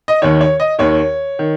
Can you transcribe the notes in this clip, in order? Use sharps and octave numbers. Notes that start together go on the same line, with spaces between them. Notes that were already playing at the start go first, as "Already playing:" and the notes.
D#5
D#2 D#3 C#5
C#5
D#5
D#2 D#3 C#5
D#3